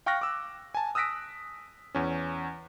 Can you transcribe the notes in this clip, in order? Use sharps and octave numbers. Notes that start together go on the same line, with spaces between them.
F5 G5 C#6 F6 F#6 A#6
D6 E6
G#5 A5
D#6 E6 F#6 A#6 B6 D7
E2 C#4